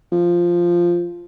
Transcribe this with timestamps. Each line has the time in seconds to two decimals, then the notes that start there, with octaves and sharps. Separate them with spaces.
0.12 F3